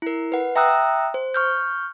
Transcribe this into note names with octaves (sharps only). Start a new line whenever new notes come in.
E4 A#4
B4 F#5
E5 G5 A#5 D#6 E6 F#6
C5
C#6 F6 G6